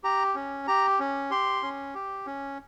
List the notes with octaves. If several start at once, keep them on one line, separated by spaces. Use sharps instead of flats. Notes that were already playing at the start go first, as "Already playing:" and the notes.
G4 A#5
C#4
G4 A#5
C#4
G4 C6
C#4
G4
C#4